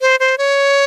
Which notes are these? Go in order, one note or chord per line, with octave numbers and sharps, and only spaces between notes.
C5
C5
C#5